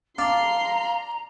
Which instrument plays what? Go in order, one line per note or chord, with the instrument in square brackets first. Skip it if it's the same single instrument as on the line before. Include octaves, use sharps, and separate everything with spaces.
[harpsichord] D4 [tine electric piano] F5 [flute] A#5 [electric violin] C6 C7